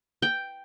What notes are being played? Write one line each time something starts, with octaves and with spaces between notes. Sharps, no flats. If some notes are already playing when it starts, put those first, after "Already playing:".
G5